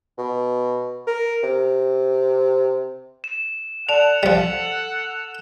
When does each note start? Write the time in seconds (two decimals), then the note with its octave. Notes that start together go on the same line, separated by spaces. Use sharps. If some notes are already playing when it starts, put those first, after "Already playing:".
0.18 B2
1.07 A#4
1.43 C3
3.24 E7
3.89 A4 D5 F#5 A5 F7
4.23 F3 G3